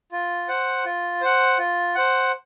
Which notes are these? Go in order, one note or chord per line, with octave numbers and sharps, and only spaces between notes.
F4
C5 F#5
F4
C5 F#5
F4
C5 F#5